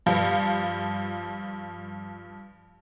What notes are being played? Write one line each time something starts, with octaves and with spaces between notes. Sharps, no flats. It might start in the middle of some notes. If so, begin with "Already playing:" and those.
G2 F3